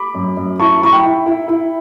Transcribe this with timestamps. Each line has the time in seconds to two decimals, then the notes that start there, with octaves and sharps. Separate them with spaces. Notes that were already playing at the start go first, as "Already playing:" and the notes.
Already playing: B5 D6
0.14 F#2
0.37 F#2
0.59 E4 A5 C#6
0.81 E4 C#6
0.92 G5 B5
1.04 E4
1.26 E4
1.48 E4